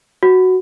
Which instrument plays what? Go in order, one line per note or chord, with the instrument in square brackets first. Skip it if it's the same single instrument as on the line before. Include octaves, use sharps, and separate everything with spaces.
[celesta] F#4